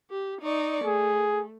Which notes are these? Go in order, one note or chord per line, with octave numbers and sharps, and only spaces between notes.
G4
D#4 D5 C#6
A3 G#4